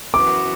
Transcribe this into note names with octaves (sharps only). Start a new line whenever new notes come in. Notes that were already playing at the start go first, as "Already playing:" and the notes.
F#2 E3 B3 F#4 D6